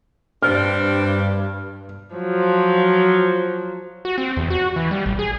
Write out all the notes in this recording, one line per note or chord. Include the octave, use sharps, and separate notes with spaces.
G2 G3 C4 D4 F6
F3 F#3
F#4
C4
E2
F#4
E3
G3
A1
G#4